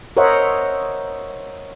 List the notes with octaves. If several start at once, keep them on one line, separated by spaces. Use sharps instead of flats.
A#4 C5 C#5 D#5 E5 F#5